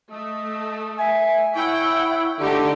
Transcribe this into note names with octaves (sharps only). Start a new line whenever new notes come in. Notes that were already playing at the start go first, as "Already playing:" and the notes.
A3 D#5
E5 G#5
E4 C#5 F#5 G5
D3 A3 D#4 G4